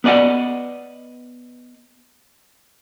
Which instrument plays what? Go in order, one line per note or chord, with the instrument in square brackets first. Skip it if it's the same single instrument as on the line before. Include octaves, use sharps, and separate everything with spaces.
[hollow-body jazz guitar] B3 B4 D5 D#5 F#5